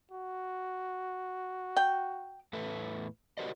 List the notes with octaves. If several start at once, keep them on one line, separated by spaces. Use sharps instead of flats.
F#4
G5
E2 A2 A4 B4 E5
F#4 G4 A#4 C5 D5 D#5